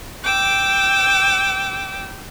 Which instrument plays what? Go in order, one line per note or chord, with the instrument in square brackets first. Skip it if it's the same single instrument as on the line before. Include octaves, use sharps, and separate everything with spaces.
[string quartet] G5 D6 E6